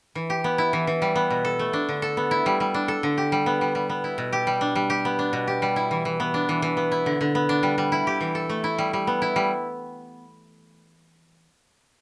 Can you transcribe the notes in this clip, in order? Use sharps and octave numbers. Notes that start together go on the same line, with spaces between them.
E3
G4
B3
E4
E3
E3
G3
B3
B2
A4
A3
D4
D3
A4
B3
E4
G3
G3
D4
A4
D3
G4
G3
B3
G3
G3
B3
E4
B2
G4
G3
D4
G3
G4
B3
D4
B2
G4
G3
E4
E3
E3
B3
D4
E3
E3
B3
E4
D3
D3
B3
D4
G3
G3
E4
G4
E3
A4
A3
E4
G3
G3
B3
E4
G3